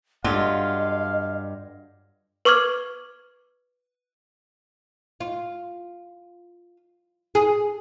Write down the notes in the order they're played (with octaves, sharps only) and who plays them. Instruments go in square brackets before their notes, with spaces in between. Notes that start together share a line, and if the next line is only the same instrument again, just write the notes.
[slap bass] G2 [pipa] D3 F#3 F4 [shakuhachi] D#5 [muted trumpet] F5
[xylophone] B4 C#6 D6 F6 G#6
[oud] F4
G#4